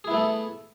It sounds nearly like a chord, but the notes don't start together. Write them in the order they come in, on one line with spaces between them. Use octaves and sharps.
G#4 E4 B3 A3 A4